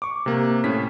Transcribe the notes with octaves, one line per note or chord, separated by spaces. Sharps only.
C#6 D6
C3 A#3
A2 C#4 B6